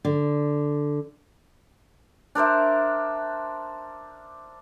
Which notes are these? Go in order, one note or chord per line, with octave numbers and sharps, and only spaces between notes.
D3
D4 A#4 C5 E5